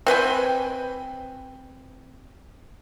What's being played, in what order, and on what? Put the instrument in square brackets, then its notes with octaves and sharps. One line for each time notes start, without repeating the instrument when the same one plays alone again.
[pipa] C4 B4 G5 G#5